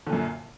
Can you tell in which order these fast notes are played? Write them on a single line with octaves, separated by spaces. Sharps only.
D3 A#2 F#2